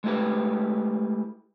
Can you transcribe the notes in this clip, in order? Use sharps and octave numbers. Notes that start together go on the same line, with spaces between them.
G#3 A3 E4 G4 B4